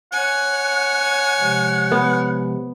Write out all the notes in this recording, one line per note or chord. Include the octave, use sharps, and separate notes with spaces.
C#5 F#5 G#5
C3 F3 G#3
B3